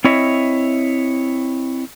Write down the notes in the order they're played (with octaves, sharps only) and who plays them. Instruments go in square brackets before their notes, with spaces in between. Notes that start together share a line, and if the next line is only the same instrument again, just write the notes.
[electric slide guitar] C4 E4 C#5 D#5 E5